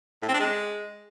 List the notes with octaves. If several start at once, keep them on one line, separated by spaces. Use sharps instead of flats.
A2
C4
D4
G#3